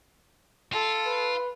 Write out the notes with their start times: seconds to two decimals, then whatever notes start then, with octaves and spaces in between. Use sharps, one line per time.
0.73 F4 A4
1.06 B4